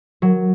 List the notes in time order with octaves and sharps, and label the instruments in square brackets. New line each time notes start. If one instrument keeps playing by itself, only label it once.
[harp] F#3